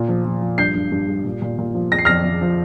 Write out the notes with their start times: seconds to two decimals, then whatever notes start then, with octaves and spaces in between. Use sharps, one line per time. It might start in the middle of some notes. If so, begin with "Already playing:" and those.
Already playing: A#2
0.08 F3
0.25 F3
0.42 F3
0.58 G2 G6 C7
0.75 G2
0.92 G2
1.08 G3
1.25 A#2
1.42 A#2
1.58 A#2
1.74 F3
1.92 F2 A#6
1.99 C7
2.05 F2 F6 A#6
2.24 F2
2.41 F3